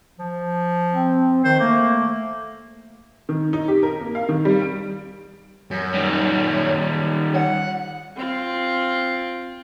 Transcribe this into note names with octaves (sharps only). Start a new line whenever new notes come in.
F3
C4
D#3 C5
A3 A#3
D#3
D#4
G4
A#4
A#3
F5
D#3
G3
D7
F#2
D#3 G3
F#5
C4 F4